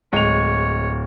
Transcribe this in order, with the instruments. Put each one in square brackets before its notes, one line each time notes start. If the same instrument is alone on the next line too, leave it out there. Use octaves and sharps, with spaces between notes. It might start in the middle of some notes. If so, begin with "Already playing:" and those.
[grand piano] D1 F7 [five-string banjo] G#3 G5 [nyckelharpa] C#5